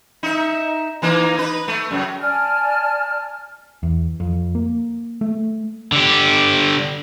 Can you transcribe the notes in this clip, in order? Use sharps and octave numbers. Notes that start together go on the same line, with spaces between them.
D#4 E5
E3 A#3 D#4
D#4 B4
A3
F#2 C#3
D5 G#5 A5 F6
E2
F2
A#3
A3
D3 G4